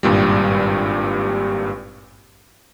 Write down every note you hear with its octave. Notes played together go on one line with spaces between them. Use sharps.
G#1 G2 A#2 G3